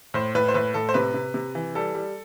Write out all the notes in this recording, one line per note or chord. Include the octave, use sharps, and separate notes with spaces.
A2 C5
A2 B4
C5
A2 B4
A2 A4
C5
C3 B4
C3
C3
E3
G3 A4
G3